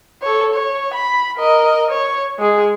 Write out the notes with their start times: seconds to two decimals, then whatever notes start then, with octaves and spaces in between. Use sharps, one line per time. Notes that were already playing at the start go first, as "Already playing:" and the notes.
0.22 A4 C#5
0.54 C#5
0.94 B5
1.37 A#4 D#5
1.91 C#5
2.39 G#3 G#4